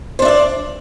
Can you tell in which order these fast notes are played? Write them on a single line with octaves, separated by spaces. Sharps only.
C5 D4 E5 D5